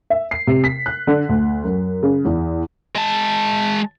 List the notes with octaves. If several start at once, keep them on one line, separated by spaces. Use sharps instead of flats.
E5
C7
C3
B6
F#6
D3
D2
F#2
C#3
E2
G#3 A5